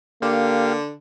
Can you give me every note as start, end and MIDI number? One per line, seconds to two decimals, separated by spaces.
0.22 0.93 50
0.22 0.77 58
0.22 0.73 67
0.22 0.73 77